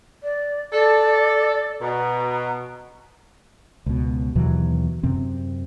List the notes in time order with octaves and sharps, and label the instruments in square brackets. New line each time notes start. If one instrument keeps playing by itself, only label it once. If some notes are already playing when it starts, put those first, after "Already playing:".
[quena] D5
[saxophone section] A4 [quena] D5
[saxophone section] B2 [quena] A#5
[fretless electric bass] C#2 B2
D#2 B2 E3 F#3
F#2 C3 C4